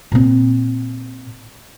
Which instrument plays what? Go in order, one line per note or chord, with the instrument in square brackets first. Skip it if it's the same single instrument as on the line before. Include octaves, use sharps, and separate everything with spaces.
[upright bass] A#2 C4